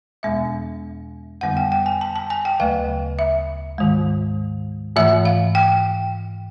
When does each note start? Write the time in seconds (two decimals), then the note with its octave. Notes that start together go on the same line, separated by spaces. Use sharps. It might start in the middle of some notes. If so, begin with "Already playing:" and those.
0.23 E2 B2 G#3 B3 E5
1.41 F2 D3 G3 B3 F#5
1.57 G5
1.72 G5
1.86 G#5
2.01 A5
2.16 A5
2.30 G#5
2.45 G5
2.60 D2 C#3 F#3 A3 F5
3.19 E5
3.78 G#2 D#3 G#3
4.96 G#2 E3 A3 E5
5.25 F5
5.55 G5